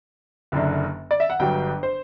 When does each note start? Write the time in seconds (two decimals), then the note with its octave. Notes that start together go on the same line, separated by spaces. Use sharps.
0.52 F#1 F#2 D3
1.11 D5
1.20 E5
1.30 F#5
1.39 G1 G2 F#3 G5
1.83 C5